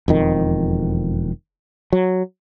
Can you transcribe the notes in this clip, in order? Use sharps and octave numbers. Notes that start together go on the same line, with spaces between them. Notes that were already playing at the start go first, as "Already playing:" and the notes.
E1 F2 D#3
F#3